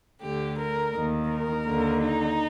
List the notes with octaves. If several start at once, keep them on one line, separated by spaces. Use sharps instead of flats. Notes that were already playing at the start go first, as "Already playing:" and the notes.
D2 D3 G4
A#4
D#2 D#3
A#4
D#2 D3
D#4